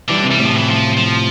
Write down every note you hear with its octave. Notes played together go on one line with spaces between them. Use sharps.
D3 E3 G3
C3 E3
G3
A2 C3 F3
E3
F3
F3